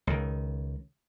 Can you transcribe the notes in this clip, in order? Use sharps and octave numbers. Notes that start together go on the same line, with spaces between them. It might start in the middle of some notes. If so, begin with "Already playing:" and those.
C#2 D#3